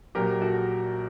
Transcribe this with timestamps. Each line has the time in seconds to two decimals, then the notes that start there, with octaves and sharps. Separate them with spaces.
0.15 A#1 A#2 F#3 G4 A#4
0.41 F#4 A4